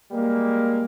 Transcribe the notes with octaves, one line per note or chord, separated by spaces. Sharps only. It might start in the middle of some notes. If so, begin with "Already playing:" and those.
G3 G#3 A#3